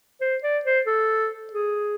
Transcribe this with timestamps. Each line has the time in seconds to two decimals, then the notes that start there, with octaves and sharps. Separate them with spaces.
0.21 C5
0.43 D5
0.65 C5
0.86 A4
1.53 G#4